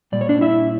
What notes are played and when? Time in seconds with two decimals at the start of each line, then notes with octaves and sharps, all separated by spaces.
0.12 A#2 G3 D5
0.21 C#5
0.29 D4 D5
0.41 E4 E5